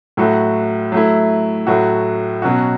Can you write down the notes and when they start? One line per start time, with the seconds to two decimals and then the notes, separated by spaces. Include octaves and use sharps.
0.17 A2 F#3 A3 F#4
0.92 F#3 A3 E4
1.67 A2 F#3 A3 F#4
2.42 B2 F#3 C#4 F#4